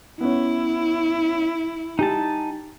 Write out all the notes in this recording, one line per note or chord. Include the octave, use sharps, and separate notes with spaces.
B3 C#4 E4
G3 D#4 G4 G#5 A5